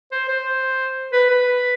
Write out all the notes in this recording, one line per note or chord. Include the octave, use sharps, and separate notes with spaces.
C5
C5
B4
B4